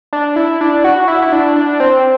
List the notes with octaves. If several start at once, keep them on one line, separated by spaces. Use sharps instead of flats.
D4
E4
D4
F#4
E4
E4
D4
D4
C4